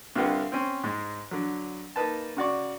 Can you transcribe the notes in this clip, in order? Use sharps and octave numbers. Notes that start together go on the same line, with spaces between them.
C2 D3 F4 G4 B4 F#5
C4 C#4 C5
G#2 G#3
D3 F#3
A#3 D#4 B4 A5
C#3 F#4 D5 C#6